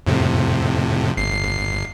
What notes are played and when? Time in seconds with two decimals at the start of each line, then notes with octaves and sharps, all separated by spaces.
0.07 F2 A2 C3
1.17 G1 C7